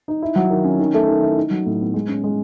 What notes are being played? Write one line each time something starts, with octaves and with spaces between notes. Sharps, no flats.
D#4
E4
F#3
D#3
C#4
D#3
A3
D#3
E4
D#4
F#3
A2
B3
G#3
C#4
G#3